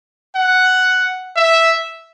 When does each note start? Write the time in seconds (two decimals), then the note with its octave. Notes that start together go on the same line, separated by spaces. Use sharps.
0.36 F#5
1.36 E5